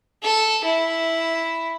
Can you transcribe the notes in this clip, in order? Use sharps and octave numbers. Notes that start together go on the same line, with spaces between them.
A4
E4